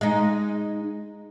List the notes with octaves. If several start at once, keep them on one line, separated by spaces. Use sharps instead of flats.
G#3 D#4